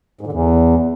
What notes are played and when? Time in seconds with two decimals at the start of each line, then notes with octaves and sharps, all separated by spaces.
0.21 G#2
0.27 D3
0.32 E2